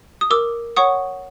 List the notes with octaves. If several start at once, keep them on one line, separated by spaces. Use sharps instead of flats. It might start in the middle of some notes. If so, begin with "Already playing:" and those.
D#6
A#4 D6 E6
C#5 F#5 C#6 D#6